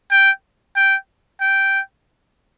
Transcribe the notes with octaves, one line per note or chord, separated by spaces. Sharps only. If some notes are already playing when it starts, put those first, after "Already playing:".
G5
G5
G5